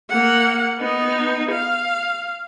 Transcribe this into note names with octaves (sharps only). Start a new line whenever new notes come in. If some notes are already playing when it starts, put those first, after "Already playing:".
A#3 F#5
B3 D#4
F5